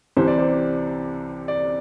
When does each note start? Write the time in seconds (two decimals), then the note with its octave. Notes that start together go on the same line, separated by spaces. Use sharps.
0.17 C2 C3 E3 C5
0.28 D5
0.38 C5
1.48 D5